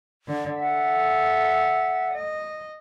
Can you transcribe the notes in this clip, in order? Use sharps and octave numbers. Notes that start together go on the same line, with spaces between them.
D3
A4 E5 F#5
D#5